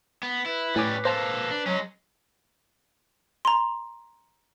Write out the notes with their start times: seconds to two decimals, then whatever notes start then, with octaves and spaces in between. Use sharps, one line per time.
0.23 B3
0.46 E4 B4
0.76 A2 G3 C#4 G#5 D6
1.05 A#3 A4 C5 A5
1.51 D4
1.66 F#3 G#3 C#4
3.45 A#5 C6